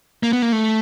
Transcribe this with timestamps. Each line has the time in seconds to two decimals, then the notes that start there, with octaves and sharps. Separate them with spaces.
0.23 A#3
0.33 B3
0.42 A#3
0.52 A3